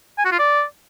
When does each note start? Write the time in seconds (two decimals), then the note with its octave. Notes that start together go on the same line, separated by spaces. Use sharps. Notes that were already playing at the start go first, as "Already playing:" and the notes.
0.18 G#5
0.25 F#4
0.32 F4
0.39 D5